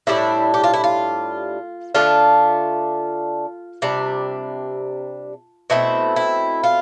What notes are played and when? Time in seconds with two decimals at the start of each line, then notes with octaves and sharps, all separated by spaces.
0.07 A2 G3 D4 E4
0.54 G4
0.64 F4
0.74 E4
0.84 F4
1.95 D3 A3 D4 F4
3.82 C3 G3 D4
5.70 B2 A3 C4 E4
6.16 E4
6.63 F4